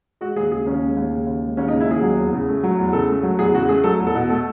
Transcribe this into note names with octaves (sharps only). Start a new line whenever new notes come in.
G#3 F#4
D#2 G#4
C#3 G#4
D#2 C#4
G#3
D#2
C#3
D#2
G#3
D#2 C#4
D#4
C#3
E4
D#2 G#4
F#3
E2
C#3
A3
F#3
E2
C#3 A4
A3
F#3
E2 G#4
C#3 F#4
A3 G#4
F#3 A4
E2
A4
B2
A3 A4